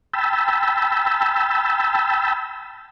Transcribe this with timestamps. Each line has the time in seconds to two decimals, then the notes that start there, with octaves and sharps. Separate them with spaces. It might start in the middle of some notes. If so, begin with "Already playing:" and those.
0.14 G5 A5 B5 E6